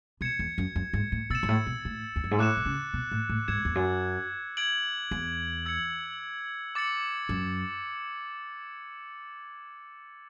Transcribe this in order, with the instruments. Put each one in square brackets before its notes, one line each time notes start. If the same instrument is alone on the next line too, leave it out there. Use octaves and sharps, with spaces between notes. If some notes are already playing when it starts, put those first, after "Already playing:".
[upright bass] B2 [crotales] G#6 C#7 E7
[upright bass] E2
F#2
F#2
G#2
A2
[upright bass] B2 [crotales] E6 A6 C#7 E7
[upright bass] G#2
A2
B2
A2
E2
F#2
G#2
[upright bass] A2 [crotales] D6 F#6 C#7 E7
[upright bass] B2
C#3
B2
A2
A2
[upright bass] G#2 [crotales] E6 G#6 C#7 E7
[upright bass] E2
F#2
[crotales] G#6 D7 F#7
[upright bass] E2
[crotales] E6 G#6 C#7
D6 A6 C#7 F#7
[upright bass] F#2